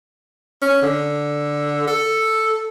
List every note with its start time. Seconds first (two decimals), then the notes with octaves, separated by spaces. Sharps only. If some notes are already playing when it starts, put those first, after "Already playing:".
0.62 C#4
0.82 D3
1.87 A4